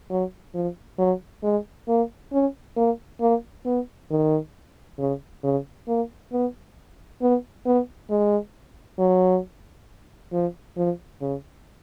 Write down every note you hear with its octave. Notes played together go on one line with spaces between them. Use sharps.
F#3
F3
F#3
G#3
A#3
C#4
A#3
A#3
B3
D#3
C#3
C#3
A#3
B3
B3
B3
G#3
F#3
F3
F3
C#3